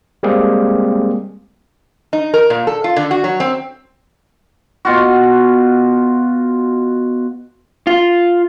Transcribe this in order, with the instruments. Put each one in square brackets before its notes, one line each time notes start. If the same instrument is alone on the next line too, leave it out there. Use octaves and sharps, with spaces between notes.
[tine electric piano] G3 G#3 A#3 C4 G4 G#4
[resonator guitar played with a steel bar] D#4
A#4
A#2
A4
F4
D3
F#4
F#3
C4
[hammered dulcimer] B2 F4 F#4
[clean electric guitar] F4